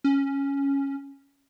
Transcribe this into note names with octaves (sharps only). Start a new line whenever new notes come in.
C#4